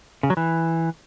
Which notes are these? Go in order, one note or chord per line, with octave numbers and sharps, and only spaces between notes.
C#3
F#3
E3